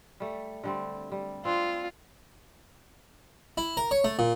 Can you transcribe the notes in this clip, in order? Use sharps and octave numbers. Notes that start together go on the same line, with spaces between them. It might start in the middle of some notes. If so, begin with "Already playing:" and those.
G3 A3
D3 G3 C4
G3
C4 D4 F4
E4
A#4
C#5
A3
A#2